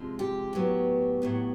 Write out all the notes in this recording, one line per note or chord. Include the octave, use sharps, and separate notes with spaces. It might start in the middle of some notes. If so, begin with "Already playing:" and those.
Already playing: C3 F3 G#3
G4
A2 F#3 B3
A2 F#3 B3